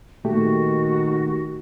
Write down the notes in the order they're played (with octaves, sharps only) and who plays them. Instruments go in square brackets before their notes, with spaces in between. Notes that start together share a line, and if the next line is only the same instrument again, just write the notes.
[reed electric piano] A#2 A3 G4 [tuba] D#3 [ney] F#4